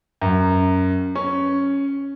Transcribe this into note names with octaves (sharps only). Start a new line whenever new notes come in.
F#2
C#4